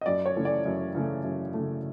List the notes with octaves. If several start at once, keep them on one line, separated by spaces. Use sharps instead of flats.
D#5
F#2 D5
C#5
C#3 E3 A3
D5
F#2
C#3 E3 A3
F#2
C#3 E3 A3